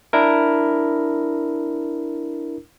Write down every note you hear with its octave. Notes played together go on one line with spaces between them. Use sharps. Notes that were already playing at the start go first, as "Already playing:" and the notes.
D4 E4 A#4